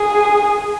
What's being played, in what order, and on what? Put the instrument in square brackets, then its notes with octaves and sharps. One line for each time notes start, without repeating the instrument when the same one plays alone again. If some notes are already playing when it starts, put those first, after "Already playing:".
Already playing: [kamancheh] G#4